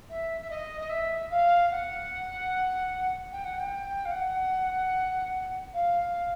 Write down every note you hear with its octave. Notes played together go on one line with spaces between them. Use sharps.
E5
E5
D#5
D#5
E5
F5
F#5
G5
F#5
G5
F5
F#5
F5